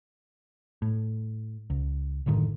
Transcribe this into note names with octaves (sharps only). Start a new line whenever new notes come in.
A2
C#2
F#1 A2 D3 D#3